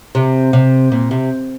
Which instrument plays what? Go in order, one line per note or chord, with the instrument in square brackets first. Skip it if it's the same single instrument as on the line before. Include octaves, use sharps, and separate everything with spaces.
[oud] C3
C3
A#2
C3